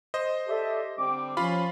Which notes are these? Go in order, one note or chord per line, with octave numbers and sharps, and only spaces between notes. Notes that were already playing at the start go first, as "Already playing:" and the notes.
C5 D#5
G4 A4 D5 E5
D3 G3 C4 D6
F3 C#4 F4 F5 B5